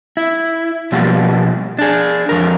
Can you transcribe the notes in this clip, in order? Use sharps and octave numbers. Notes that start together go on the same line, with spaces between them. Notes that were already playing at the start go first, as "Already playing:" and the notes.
E4
B2 F3 G3 A#3
D4 G#4
F2 A#2 A#4